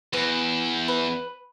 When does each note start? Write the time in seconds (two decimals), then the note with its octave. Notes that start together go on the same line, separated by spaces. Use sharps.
0.13 E2 B4
0.88 B4